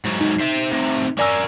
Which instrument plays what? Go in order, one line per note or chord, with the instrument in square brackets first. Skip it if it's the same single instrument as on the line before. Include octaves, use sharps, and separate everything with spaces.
[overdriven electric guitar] G#2 F#3
[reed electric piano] D#4
[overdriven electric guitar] C5 E5
A2 C3
[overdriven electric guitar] C#4 A#4 [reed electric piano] D5 G#5 E6